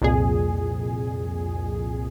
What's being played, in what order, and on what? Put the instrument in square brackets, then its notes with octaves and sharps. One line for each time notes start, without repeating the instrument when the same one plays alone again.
[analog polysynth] C2 F2 A#2 G#4